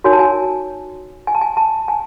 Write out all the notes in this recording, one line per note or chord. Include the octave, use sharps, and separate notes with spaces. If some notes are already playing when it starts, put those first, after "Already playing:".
D#4 F#4 A#4 C#5 G#5
A5
G#5
G#5
A5
G#5
A5
G#5